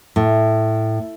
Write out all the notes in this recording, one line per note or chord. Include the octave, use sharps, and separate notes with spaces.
A2